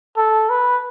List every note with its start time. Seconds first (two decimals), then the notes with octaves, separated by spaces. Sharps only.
0.17 A4
0.50 B4